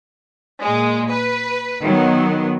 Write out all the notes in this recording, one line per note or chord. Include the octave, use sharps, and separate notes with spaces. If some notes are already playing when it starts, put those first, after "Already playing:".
A#2 G#3
B4
D#3 F#3 B3